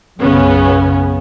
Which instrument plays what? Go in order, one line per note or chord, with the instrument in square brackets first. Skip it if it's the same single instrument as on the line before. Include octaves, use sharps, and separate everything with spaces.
[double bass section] B1 F#2 C#3 [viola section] B3 C#4